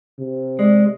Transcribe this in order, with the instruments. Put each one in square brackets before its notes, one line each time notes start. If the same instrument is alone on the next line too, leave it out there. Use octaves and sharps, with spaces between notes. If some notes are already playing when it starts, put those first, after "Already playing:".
[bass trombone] C3
[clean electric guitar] G#3 [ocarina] D5